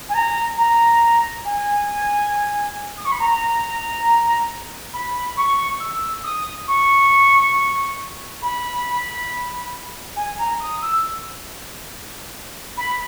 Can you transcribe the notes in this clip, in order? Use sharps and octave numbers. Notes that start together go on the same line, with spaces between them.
G#5
A#5
A#5
G#5
D#6
C#6
B5
A#5
B5
C#6
E6
D#6
C#6
B5
G#5
A#5
D#6
E6
B5